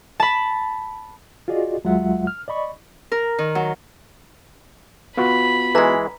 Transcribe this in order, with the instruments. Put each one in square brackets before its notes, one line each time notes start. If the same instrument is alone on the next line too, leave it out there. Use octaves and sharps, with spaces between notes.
[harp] A5 B5
[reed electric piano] F4 F#4 G#4 D5 D#5
D#2 F#3 G#3 F4 E5 F#5
F6
D5 D#5 B5 C#6
[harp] A#4
D#3
F#3
[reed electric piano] B3 F4 F#4 [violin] B5
[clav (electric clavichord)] E3 G#3 [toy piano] B4 A#5